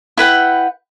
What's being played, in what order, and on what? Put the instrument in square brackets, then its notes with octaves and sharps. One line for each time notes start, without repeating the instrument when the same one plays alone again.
[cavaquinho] E4 B4 F#5 G5